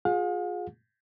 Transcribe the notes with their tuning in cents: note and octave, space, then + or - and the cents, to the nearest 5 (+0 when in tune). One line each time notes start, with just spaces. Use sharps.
F4 +30 G#4 +0 F5 +45